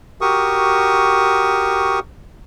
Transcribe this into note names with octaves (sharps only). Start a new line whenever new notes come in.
F#4 G4 A#4 C#6 D#6